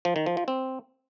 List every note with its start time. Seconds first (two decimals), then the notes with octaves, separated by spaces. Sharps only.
0.05 F3
0.16 D#3
0.26 F3
0.37 F3
0.48 C4